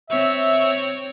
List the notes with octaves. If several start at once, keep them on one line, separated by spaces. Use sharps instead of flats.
C4 C#5 E5